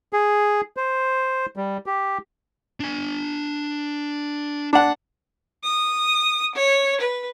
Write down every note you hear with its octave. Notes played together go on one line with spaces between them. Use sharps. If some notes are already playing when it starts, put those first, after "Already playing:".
G#4
C5
G3
G4
D4 G#5
D4 F#5
D#6
C#5
B4